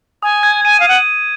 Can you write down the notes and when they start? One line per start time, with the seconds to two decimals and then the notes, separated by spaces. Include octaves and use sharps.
0.23 G#5 D#6
0.43 G#6
0.65 G#5 D#7
0.80 F5
0.86 F#5 D#7